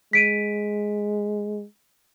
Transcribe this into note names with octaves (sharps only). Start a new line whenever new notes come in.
G#3 B6 D7 D#7